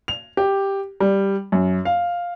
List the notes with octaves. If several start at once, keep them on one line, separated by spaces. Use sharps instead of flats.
F7
G4
G3
F#2
F5